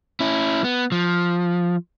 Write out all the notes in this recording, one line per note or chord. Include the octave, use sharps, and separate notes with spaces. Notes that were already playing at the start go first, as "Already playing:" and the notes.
C#4 E4
B3
F3